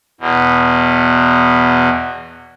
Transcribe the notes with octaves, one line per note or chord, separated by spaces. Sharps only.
E2 B2